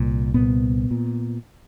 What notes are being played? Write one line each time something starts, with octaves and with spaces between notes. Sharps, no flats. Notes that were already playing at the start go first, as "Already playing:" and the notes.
Already playing: C2 A#2
C2 A#2 B3
A#2